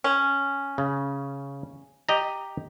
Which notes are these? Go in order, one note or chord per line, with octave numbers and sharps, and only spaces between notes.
C#4
C#3
G4 D#5 A#5